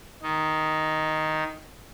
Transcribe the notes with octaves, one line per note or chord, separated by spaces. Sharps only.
D#3 D#4